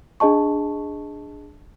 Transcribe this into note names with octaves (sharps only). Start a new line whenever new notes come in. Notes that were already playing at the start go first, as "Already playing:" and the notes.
D4 G#4 D#5 A5 C#6